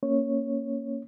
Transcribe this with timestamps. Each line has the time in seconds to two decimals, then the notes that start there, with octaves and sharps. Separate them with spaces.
0.03 A#3 C#4 C#5